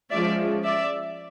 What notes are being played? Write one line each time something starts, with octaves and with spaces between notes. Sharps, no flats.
F3 G#3 C#4 D5 E5
D5 E5